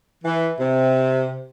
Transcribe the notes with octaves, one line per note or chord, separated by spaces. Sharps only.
E3
C3